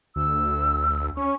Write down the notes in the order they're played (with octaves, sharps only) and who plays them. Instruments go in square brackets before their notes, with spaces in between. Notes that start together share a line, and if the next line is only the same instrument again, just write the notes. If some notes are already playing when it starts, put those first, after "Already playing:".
[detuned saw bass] D2 [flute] E6
[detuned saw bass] C#4 [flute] C#6